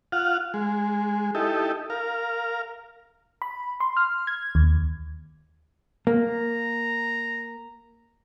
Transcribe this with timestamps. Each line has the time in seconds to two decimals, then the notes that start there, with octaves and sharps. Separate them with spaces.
0.12 F4 F5 F#5
0.54 G#3
1.35 D#4 E4 G4 A4
1.90 A#4 F5
3.42 B5
3.80 C6
3.97 F6
4.27 G#6
4.55 D#2
6.07 A#3 A#5